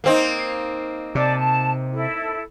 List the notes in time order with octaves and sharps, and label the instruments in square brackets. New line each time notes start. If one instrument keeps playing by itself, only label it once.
[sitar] A#3 C4 D#4
[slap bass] C3 [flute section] D5 A5 D6
[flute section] A5
E4 A4